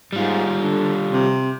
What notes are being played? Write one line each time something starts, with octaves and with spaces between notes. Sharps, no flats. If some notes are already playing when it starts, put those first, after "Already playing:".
G#2 G3 F4
D3
C3